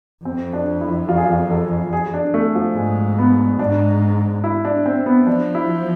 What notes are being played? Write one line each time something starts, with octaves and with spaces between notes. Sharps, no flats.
F2 C4
D4
E4
F4
G#4
F4
A4
G#4
D4
A3
F3
G#2 G#3
B3
G#2 D4
E4
D4
C4
B3
F3 D4
E4